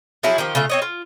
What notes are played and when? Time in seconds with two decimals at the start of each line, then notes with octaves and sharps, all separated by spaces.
0.23 F3 F#3 E4 G#4
0.38 D#3 F3 G4
0.55 C#3 A3 F4
0.70 C4 C#5 D#5
0.82 F4